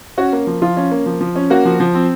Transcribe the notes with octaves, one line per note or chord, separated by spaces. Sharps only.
C#4 F#4
A#3
F3
F3 F4
C#4
A#3
F3
F3
C#4
A#3 F#4
F3
F3
C4